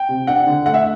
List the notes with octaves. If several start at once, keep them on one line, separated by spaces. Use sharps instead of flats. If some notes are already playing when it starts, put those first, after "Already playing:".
Already playing: G5
C3
D4 F#5
D3
A3 F#5
E5